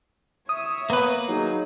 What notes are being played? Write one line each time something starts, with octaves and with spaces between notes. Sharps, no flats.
C#5 E5 D#6
A#3 B3 B4
F#3 D#4 G#4